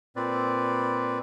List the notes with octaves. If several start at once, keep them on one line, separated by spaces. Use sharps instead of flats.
A#2 C4 B4 D5